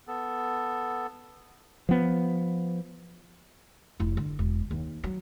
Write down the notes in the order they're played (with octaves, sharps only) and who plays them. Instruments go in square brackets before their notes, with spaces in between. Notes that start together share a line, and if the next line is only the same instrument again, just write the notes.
[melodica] B3 A4
[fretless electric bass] F3 B3
[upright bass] F1 E4
D3
E1
D#2
F#3